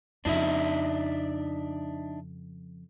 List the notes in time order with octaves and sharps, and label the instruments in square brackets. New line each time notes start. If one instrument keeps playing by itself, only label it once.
[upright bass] F2 C#3 [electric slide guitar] D4 D#4 E5